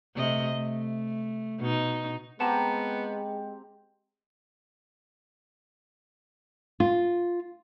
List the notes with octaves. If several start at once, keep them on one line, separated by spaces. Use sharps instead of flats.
C3 A3 D#5
A3
B2 D#4
G#3 B3 C4 G4 F#5 A5 A#5
F4